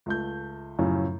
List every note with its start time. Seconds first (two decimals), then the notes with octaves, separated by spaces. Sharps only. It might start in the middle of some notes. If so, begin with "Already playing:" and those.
0.06 C#2 A3 G6
0.79 F#2 A2 C#3 F3